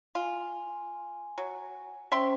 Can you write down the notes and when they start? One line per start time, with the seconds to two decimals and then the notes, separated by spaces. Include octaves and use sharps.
0.15 F4 G#5
1.38 F#3
2.12 C#4 C5 E5 G5 C6